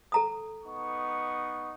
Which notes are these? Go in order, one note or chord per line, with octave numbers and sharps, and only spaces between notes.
A4 A#5 D#6
B3 D#4 C#6